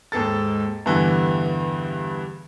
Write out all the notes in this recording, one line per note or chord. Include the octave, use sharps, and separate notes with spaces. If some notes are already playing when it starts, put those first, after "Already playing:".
D#2 G#2 G#3 A4 A6
E2 G2 D3 E3